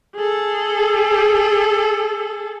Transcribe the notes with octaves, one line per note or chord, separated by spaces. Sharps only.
G#4 A4